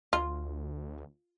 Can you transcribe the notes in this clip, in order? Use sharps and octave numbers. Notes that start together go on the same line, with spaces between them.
D2 F4